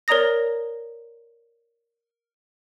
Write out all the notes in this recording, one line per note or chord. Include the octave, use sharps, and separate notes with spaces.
A#4 C#5 D5 A#5 D#6 A#6